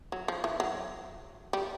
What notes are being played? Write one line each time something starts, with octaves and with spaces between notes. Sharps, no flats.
F#3
F3
E3
F#3
G3